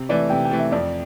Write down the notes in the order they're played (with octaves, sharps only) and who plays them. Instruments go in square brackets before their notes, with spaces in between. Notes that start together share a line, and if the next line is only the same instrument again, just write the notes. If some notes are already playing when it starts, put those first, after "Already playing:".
Already playing: [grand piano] C3
[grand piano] E3 A3 [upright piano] D5
[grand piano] C3 [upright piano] G5
[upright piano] G5
[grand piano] E3 A3
[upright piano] E5
[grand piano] F2 [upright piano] D5